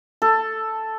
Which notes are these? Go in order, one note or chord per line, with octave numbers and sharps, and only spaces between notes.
A4